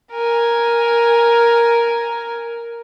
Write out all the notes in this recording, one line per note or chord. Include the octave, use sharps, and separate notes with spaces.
A#4 G#5